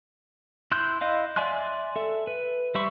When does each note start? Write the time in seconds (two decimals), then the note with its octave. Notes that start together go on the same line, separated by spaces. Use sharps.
0.72 E4 C6 F#6 G6
1.01 E4 D#5 F5
1.36 D5 E5 G#5 C6 F#6
1.96 A4 E5
2.27 B4
2.75 G3 C5 E5 B5 C#6